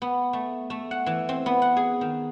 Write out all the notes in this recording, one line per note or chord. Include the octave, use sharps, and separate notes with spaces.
B3
A3
A3
F#5
E3
C4
B3
F#5
G#4
D#3